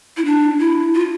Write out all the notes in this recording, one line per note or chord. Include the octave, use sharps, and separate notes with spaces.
E4
D4
E4
F4